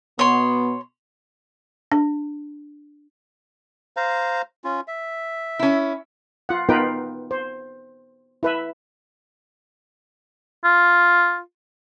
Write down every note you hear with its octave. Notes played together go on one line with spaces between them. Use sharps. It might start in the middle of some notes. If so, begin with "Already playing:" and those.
B2 B3 C#5 C6
D4
C5 F5 A#5
C#4 F4
E5
C#4 E4
F4 F#5
B3 D#4 F4 A#4 B4 G5
C5
E4 B4 E5
F4